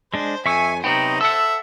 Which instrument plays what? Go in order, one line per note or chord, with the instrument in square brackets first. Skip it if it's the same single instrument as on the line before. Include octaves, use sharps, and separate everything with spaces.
[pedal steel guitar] G#3 D4 [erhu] C5
[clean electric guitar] F2 [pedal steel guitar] E5 C#6 E6 [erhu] G#5
[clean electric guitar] C3 F#3 B3 [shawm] D#4 [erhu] C5 [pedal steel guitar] G5
[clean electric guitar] A4 F#5 [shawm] E5 [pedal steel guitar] E6